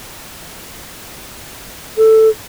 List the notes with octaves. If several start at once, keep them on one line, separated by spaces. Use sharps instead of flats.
A4